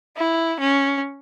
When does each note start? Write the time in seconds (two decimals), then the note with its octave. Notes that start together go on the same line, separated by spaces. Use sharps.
0.17 E4
0.60 C#4